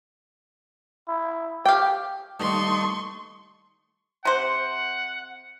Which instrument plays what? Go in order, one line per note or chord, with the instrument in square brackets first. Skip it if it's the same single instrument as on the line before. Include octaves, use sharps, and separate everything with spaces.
[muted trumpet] E4
[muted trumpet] G4 [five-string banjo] F5 G5
[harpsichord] G2 D#3 A#3 [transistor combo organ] A3 D#4 [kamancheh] C6 C#6
[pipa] C3 C5 [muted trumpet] F#5